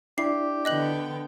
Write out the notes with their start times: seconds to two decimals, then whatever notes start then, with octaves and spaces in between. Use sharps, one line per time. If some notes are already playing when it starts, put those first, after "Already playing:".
0.18 D4 E4 G4 D5 C7
0.65 D3 B3 D#5 G5 F#6 F#7